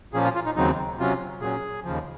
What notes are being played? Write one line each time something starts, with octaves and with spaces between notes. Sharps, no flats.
A#2 F3 A#3 C#4 G#4
F4
F4
D#4
D#2 C#3 F#3 C4 D#4
C3 F#3 C#4 F4
A#2 F#3 C#4 G#4
D#2 C#3 F3